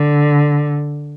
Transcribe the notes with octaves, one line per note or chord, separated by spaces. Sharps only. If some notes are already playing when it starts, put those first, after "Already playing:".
Already playing: D3